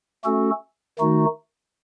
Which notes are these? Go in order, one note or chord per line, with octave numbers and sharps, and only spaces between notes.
A3 C#4 F#4 A4
D#3 A3 D#4 F#4